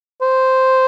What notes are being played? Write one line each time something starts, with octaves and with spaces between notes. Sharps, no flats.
C5